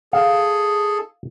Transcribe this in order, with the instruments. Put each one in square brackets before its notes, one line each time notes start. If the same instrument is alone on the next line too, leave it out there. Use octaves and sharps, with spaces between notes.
[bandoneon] G#4 A4 [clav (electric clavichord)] F5